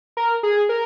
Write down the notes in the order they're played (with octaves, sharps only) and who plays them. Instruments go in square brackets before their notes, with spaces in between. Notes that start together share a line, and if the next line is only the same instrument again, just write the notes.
[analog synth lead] A#4
G#4
A#4